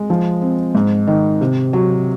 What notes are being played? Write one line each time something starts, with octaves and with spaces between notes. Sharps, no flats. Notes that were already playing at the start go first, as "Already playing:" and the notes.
Already playing: G#3
F3
C4
G#2
D#3
C3
F#3